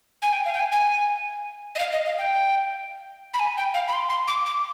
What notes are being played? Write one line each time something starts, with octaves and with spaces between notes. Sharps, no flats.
G#5
G5
F5
G5
G#5
G#5
D#5
F5
D#5
F5
G5
B5
G#5
G5
F5
B5
C6
C6
D6
D6